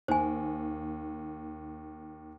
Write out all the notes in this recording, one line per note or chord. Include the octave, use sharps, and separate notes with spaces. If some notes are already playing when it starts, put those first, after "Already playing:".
D#2 C5 G#5